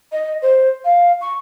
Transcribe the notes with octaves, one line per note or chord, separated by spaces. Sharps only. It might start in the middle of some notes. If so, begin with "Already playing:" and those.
D#5
C5
F5
C#6